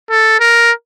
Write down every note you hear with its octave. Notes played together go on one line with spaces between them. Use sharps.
A4
A#4